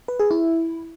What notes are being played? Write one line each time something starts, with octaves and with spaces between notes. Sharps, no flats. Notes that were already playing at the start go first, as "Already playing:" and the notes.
B4
G#4
E4